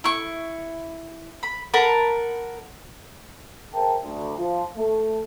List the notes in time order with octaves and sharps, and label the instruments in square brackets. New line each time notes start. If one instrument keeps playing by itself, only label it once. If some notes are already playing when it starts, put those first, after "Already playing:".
[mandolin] E4 C#6
B5
A#4 F#5 A5 B5
[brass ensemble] G#4 A#4 C5 E5 G5 A5
D2
F3
A3